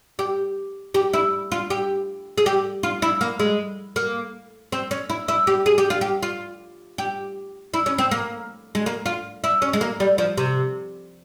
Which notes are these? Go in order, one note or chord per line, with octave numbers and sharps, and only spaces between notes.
G4
G4
E4
F4
G4
G#4
G4
F4
E4
A#3
G#3
A#3
C4
C#4
E4
E4
G4
G#4
G4
F4
G4
F4
G4
E4
C#4
C4
A#3
G#3
A#3
F4
E4
C#4
G#3
A#3
G3
F3
C3